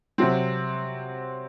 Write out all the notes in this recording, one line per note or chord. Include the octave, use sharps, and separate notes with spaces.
C3 F#3 C4